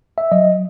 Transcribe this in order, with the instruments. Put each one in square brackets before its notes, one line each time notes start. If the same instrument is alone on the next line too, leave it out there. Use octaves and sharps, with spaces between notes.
[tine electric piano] E5
F#3 D#5